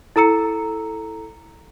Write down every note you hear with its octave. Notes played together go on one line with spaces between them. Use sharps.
E4 A4 A#5 E6 C#7